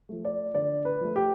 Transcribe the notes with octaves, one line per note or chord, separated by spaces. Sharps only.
F3 A3
D5
D3 D5
B4
F3 A3
G4